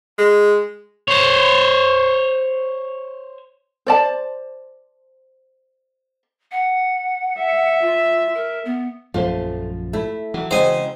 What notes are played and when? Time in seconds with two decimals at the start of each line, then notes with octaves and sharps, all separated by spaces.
0.18 G#3
1.08 C5 C#5
3.87 C5 D5 A5
6.52 F#5
7.39 E5
7.82 F4
8.35 A#4
8.65 B3
9.14 A#1 F#2 F3 A3 F4 C5
9.93 A3 E4
10.34 E3 F#3 A3
10.51 C#3 F#3 G#3 C4 C5 D#5 G#5